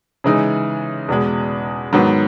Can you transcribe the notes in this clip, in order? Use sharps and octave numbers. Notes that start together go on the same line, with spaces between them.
C#3 E3 G#3 D#4
E2 B2 G#3
G#2 D#3 F#3 B3